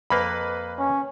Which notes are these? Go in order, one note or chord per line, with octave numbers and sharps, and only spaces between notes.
F2 A#3 B4 B5
C#4